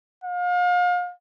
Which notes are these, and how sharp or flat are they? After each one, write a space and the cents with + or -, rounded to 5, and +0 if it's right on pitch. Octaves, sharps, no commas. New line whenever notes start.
F5 +35